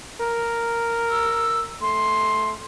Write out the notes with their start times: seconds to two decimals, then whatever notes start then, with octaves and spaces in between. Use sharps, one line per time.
0.21 A#4
1.10 E6
1.82 A3 C6